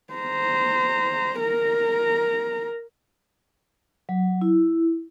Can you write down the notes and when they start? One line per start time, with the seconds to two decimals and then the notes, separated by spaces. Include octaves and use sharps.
0.14 C5 A#5
1.40 A#4 A#5
4.09 F#3
4.41 E4